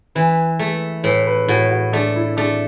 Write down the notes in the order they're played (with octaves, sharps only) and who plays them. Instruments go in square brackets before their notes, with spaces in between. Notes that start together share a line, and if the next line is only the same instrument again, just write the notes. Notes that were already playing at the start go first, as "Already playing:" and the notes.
[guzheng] E3 [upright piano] B4
[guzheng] A3
[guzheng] A2 [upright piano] B4
[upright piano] B4
[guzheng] A2 [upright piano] F#4
[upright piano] F#4
[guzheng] A3 [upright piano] D4
[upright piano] E4
[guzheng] A3 [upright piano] D4